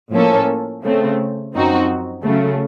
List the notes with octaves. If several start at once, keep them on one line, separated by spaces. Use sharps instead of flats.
A2 F3 A#3 C#4 A4
C#3 A3 C4
F#2 F3 C4 D#4 F#4
C#3 F#3 A3